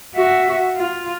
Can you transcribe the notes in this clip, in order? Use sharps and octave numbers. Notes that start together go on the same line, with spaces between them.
F#4 E5
F4